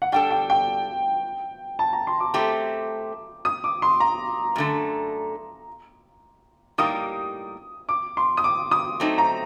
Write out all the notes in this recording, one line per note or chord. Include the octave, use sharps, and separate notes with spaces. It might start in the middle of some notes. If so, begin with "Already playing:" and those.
F#5
G3 D4 A4 G5
G5
G5
A5
A#5
C6
D6
A3 C4 G4 D6
D#6
D6
C6
A#5
F#2 D3 A3
A2 G3 A#3 D#4 G4 D#6
D6
C6
D#6
D6
D#6
F#3 A3 C4 D#4
A#5